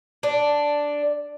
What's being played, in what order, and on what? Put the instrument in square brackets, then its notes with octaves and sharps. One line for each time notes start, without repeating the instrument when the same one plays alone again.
[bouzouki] D4